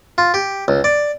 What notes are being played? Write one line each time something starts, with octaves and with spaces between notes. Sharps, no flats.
F4
G4
C#2
D5